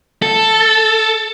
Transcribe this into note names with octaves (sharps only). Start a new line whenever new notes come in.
A4